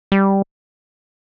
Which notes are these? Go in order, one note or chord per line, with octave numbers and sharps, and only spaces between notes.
G3